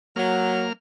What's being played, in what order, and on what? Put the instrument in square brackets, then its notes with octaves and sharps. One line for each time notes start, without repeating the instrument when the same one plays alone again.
[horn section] F#3 [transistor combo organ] A#3 F6